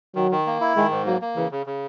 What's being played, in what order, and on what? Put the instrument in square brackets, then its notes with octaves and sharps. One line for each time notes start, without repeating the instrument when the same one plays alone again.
[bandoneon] D#3 [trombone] F#3
[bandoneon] D#3
A#3
E4
[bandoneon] D#3 [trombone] G#3
[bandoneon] G#2
[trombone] F#3 [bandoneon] A#3
[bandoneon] A#3
[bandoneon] C#3 [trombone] E3
[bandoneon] C#3
C#3